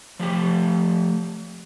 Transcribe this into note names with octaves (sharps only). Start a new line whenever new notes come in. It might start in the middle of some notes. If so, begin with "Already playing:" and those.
F3 A3 G4